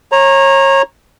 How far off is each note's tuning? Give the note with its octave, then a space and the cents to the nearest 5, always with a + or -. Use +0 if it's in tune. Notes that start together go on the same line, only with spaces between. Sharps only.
C#5 -30 A#5 +0